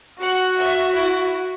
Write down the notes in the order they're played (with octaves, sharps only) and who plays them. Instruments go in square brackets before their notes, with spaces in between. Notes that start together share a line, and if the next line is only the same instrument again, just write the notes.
[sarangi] F#4 [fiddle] F#5
[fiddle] E5
E4